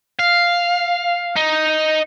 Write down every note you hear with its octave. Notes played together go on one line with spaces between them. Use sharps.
F5
D#4